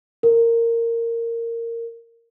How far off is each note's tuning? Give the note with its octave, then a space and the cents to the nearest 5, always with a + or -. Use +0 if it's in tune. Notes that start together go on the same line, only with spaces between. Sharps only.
A#4 -15